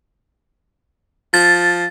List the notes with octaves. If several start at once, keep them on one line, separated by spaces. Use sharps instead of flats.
F3 A6